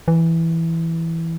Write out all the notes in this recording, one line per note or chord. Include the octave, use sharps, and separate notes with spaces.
E3